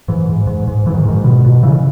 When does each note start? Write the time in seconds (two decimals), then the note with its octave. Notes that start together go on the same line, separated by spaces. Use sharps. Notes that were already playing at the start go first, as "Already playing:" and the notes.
0.08 G#2 E3
0.29 G#2
0.47 G#2
0.67 G#2
0.86 G#2 E3
0.94 D#3
1.05 G#2 D#3
1.24 B2
1.44 B2
1.63 C#3 E3